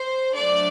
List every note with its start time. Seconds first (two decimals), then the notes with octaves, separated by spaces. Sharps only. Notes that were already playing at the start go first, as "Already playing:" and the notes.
Already playing: C5
0.33 F#3 A3 D4 D5